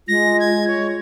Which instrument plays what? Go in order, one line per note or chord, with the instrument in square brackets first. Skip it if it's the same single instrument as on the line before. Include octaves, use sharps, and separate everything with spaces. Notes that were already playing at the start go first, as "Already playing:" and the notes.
[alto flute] G#3 [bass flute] F4 [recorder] A#6
[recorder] G#6
C#5